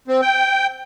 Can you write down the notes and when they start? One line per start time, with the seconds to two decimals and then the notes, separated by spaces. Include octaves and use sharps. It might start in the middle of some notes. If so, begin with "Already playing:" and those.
0.08 C4
0.22 G5